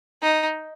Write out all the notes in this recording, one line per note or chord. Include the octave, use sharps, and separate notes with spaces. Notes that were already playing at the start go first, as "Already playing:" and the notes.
D#4